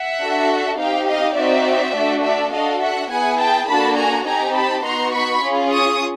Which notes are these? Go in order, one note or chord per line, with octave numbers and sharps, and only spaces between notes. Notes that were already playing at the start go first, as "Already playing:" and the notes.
Already playing: E5 F#5
D4 F#4 A4
C4 D#4 G4 F5 G5
D#5 F5
C4 D#4 F#4 D5 E5
A3 D4 F#4
D5 E5
D4 F#4 A4 D#5 F5
E5 F#5
B3 E4 G#4 F#5 G#5
G5 A5
A#3 D4 F#4 A4 A5 B5
G#5 A#5
C4 D#4 G4 G#5 A#5
A5 B5
B3 D#4 F#4 A#5 C6
B5 C#6
C#4 F4 G#4
C#6 D#6